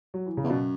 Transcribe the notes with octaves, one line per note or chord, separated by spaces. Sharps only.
F#3
E3
C#3
E2
F#2 B2